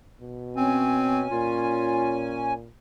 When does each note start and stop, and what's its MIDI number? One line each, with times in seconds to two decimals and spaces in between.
0.21 1.26 47
0.56 1.23 60
0.56 2.54 61
0.56 2.54 80
1.31 2.71 46
1.31 2.26 65